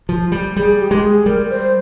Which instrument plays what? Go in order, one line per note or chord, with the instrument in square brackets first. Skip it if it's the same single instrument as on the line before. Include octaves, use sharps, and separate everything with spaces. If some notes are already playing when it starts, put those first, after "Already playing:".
[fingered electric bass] F3
G3
[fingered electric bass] G3 [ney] G#4
[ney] G4
[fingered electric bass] G#3
[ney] G#4
[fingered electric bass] G3 [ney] A#4
[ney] C5